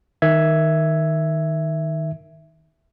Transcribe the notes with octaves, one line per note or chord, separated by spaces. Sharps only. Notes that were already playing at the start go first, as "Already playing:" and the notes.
D#3 E5 G#6